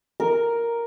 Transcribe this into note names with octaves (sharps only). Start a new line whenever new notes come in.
A#4